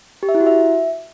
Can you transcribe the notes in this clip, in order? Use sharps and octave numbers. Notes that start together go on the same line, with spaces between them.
G4
E5
E4
F#4
E5